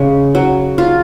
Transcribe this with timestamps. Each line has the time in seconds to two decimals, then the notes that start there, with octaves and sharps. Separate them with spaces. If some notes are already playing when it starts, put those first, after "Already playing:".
Already playing: C#3 G#3
0.35 F#3
0.78 F4